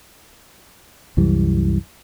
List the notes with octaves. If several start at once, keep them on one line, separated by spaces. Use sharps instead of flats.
C2 F#2 E3 G3